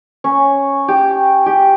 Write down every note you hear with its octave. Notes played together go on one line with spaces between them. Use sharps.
C#4
G4
G4